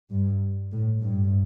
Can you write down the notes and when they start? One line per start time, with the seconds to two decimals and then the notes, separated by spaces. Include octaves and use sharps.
0.10 G2
0.72 A2
1.02 G2